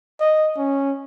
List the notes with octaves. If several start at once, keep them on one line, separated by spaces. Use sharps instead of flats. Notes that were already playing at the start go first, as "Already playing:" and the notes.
D#5
C#4